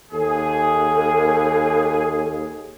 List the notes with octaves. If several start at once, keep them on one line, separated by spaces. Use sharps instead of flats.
D#2 G#4 A4